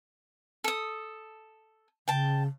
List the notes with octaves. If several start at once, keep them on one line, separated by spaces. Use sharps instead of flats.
A4 D#6
C#3 G5 A5